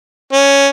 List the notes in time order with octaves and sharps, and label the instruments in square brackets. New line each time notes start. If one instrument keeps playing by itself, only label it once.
[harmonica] C#4